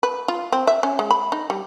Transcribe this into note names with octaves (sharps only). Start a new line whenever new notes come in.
B4
F4
C4
E5
C#4
G#3
B5
D#4
G3